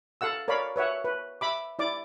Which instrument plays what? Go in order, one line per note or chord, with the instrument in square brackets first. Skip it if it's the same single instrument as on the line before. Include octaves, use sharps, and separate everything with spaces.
[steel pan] A4 F5 F#5 E6
A#4 C#5 D5 F5 B5
B4 C#5 E5 F#5
B4
E5 B5 D6
E4 D5 D6